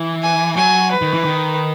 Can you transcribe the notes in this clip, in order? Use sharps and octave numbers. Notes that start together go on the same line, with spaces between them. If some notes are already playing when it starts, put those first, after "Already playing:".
Already playing: E3
G#5
F#3 G#5
B4
D#3
E3
D#3